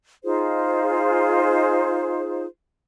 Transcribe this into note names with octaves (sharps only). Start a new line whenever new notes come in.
D#4 F4 G#4 C5